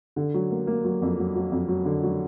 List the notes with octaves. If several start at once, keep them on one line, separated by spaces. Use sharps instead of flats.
D3
F#3
A#3
A#3
F#3
F2
F#3
F#3
F2
F#3
D3
F#3